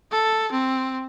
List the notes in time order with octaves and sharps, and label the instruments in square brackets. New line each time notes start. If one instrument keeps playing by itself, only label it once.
[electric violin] A4
C4